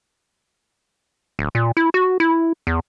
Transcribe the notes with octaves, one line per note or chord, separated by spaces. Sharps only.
D1
A#2
E4
F#4
E4
E2